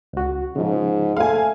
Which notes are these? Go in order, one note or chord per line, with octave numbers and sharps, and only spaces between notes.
C#2 F#4
G#2 C#3 F3
A3 F5 G#5